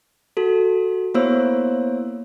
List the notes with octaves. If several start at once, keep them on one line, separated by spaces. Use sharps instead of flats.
F#4 A4
A#3 B3 E4 C5 C#5 E6